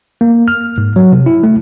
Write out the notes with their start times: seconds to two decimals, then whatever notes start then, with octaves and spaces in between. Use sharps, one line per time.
0.21 A#3
0.48 F6
0.78 G#2
0.96 F#3
1.12 C3
1.26 E4
1.43 A3